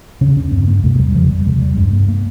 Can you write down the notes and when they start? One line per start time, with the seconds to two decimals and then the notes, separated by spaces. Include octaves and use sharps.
0.21 E2 C#3 C#4
0.37 C#4
0.52 G2 C4
0.67 A#3
0.83 E2 C3 G#3
0.99 G3
1.14 F2 C#3 F3
1.30 G3
1.45 E2 C3 G#3
1.62 G3
1.77 G2 G#3
1.93 A#3
2.08 A#3